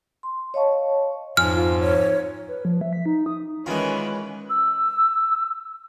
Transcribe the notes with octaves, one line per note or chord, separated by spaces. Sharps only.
C6
C#5 D#5 F5 A5 C#6
F2 G#2 G#5 F6
F4
C#5
B4
F3
E5
B6
D#4
D#6
D#3 E3 G#3 C#4 F4 B4
E6